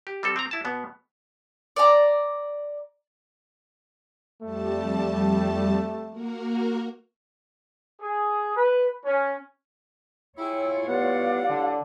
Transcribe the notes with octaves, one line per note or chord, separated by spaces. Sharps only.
G4
G3 C4 A4
C4 A#5
E4 A5
B2 B3
D5 A#5
F2 G3 A3 A5
A#3 F#4 A#4
G#4
B4
C#4
E4 F4 G#4 C#5 G5 E6
A2 G3 B3 D5 F5 F#5
D3